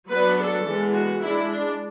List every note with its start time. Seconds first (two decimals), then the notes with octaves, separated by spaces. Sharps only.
0.09 F#3 B3 D4 B4
0.37 A4
0.65 E3 G#3 B3
0.93 F#4
1.21 G#3 D4 E4
1.49 D4